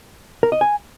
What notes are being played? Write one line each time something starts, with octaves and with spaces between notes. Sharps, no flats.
A#4
D#5
G#5